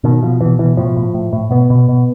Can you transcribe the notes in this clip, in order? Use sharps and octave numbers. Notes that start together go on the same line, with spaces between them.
B2 D#3
B2 F3
B2 E3
B2 E3
A2 F3
A2
A2
A2
B2 B3
B2
B2